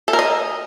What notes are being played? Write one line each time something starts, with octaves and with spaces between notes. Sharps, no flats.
A4
A#4
D#5